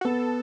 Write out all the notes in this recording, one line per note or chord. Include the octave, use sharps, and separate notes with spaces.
F#4
B3 A4